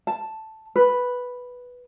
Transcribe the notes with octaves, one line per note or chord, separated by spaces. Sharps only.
A5
B4